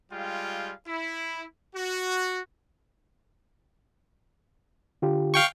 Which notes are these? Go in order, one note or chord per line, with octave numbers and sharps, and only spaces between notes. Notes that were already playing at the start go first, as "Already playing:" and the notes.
G3 G#3 F4 F5 G5
E4
F#4
D3 F4 G4
F5 G5 C#6